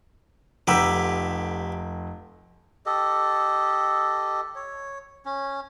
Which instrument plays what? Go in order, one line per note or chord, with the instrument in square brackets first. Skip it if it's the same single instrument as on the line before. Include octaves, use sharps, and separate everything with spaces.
[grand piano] F1 A#5 E6 [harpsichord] D3 G4 B4
[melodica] G4 A4 D#5
C#5
C#4